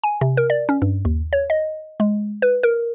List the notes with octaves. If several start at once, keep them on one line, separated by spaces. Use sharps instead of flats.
G#5
C3
A#4
D5
C#4
G2
D#2
C#5
D#5
G#3
B4
A#4